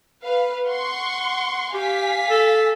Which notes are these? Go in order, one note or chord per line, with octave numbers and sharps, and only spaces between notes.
B4 F5
F#5 C6 C#6
G4 F5 G#5 B6
A4